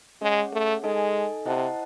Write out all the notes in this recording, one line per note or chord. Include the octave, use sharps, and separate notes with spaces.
G#3 C#4 G#4 C#5 F#5
A3
G#3 D#4 A4 D#5 G#5
C3 E4 C5 D#5 F#5 A5